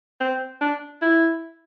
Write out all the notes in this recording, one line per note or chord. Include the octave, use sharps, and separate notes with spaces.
C4
D4
E4